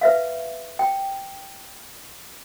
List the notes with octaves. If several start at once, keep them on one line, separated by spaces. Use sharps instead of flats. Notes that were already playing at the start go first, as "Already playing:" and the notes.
B4 E5 F5
G5